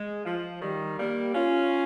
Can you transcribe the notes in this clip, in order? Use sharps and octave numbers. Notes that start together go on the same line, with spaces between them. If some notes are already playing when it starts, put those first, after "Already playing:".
Already playing: G#3
F3
D#3 G3
G3 A#3
C#4 F4